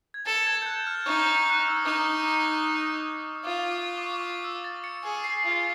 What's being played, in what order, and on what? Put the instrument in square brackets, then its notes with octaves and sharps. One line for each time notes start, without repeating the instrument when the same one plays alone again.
[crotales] G#6
[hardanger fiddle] A4 [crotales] A6
[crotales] G#6
G6
F#6
F6
[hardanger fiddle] D#4 [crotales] C#6
[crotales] F#6
F6
E6
D#6
[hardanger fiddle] D#4 [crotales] D6
[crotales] D#6
[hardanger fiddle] F4 [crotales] D6
[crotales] D6
D6
C#6
D6
E6
A6
C#7
[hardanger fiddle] G#4
[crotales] C7
[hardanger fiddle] F4